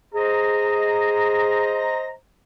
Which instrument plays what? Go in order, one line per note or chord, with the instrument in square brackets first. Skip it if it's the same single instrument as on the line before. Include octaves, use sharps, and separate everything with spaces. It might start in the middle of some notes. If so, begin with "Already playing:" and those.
[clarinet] G#4 [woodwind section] C5 D#5 A#5